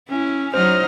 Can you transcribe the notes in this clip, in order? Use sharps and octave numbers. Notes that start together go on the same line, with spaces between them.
C#4 E4
F#3 D#4 C5 D#5 F6